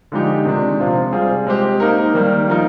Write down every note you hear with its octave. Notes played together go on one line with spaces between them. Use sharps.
D3 F3 G#3 D#4 G4
C3 D#3 G#3 D4
C3 F3 C4 F4
G3 C4 F4 G#4
G#3 C4 G4 C5
A#3 D#4 A#4
D#3 G3 A#3
F3 A#3 D#4